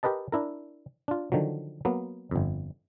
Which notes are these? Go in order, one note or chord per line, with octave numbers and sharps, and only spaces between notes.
G4 A#4 B4 D#5 A5
D4 E4 A#4
D4 F4
D3 D#3 F3 F#3
F#3 A#3 B3
G1 F2